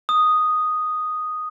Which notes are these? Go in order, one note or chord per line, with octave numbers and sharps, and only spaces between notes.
D#6